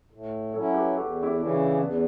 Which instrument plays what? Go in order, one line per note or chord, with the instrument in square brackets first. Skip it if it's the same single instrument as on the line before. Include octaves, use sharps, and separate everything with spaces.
[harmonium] A2
[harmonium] F#3 C#4 E4 [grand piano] A4 C#5
[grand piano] G4 B4
[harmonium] E2 [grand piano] F#4 A4
[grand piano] E4 G4
[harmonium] C#3 E3 [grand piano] D4
[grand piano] C#4 E4
[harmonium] E2 [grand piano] B3 D4